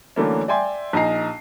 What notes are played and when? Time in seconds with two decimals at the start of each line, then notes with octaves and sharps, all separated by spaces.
0.16 D3 E3 F#3 A3 A#3 C#4
0.48 D5 E5 G5 G#5 C6
0.93 A#1 D#4 D#5 G#5 A#5 C7